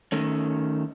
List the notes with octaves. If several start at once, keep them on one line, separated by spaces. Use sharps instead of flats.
D#3 A3 C#4